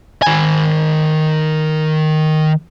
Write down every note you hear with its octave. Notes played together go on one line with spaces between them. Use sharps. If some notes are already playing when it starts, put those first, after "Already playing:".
D#3 G#5